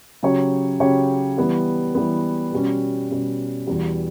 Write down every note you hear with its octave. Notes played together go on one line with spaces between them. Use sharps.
C#3 F#3 C#4 G4 C#5
C#3 F#3 C#4 G4 C#5
E3 G3 B3
E3 G3 B3
B2 G3 C#4
B2 G3 C#4
E2 B2 G3